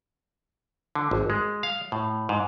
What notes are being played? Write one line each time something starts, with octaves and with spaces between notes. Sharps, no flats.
D3
G#1
G#3
F5
A2
G#2